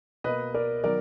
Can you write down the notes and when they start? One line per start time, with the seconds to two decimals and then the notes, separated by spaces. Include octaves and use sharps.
0.24 B2 A#3 B4 D#5
0.54 A#4 D5
0.84 D#3 F#3 B3 A#4 D5